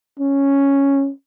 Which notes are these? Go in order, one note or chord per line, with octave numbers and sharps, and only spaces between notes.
C#4